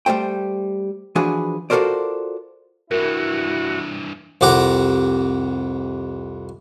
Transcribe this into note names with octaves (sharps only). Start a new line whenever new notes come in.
G3 A3 C5 G5
E3 F3 D4 F#4 G#4 B4
F4 F#4 A4 A#4 C5 D5
G2 E3 E4 F#4 A#4
C2 F2 G4 F#5 A#5